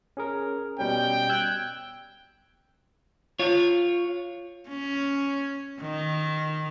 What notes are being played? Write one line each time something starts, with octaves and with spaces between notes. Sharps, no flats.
C#4 G#4 A#4
B2 G3 C#4 G5
E6 F#6 G#6
F4 C#5
C#4
D#3